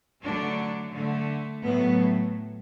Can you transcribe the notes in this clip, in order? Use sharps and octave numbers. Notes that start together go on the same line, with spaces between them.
D3 F#3 A3 D4
D3 A3
A2 F#3 A3 B3